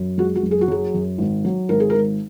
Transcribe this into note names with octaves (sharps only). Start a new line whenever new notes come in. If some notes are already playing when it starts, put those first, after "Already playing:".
Already playing: F#2
G#3 F#4
F#4
F#1
G#4
F#4
F#3 G#4
F#2
G#1
F#3
G#1 A#4
G#4
A#4
G#1